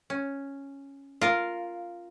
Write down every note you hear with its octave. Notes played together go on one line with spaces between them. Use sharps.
C#4
F4 A#4 F5